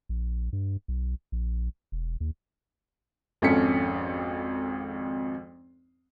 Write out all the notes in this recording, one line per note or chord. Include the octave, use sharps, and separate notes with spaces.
A#1
G2
B1
A#1
E1
D#2
G#1 F2 C#4 A4 B6 C#7